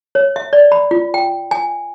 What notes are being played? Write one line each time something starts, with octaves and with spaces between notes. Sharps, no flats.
C#5
E5
D5
B5
F4
G5
G#5